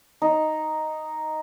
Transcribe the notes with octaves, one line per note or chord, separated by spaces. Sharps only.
D#4